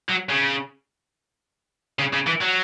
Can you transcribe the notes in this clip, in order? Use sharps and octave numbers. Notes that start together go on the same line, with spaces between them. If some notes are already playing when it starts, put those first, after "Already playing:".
F#3
C#3
C#3
C#3
E3
F#3